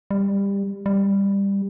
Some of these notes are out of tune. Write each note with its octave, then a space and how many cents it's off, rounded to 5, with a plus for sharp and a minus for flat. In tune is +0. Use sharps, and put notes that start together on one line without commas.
G3 +20
G3 +15